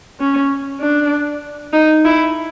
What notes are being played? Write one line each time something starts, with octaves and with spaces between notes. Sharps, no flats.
C#4
D4
D#4
E4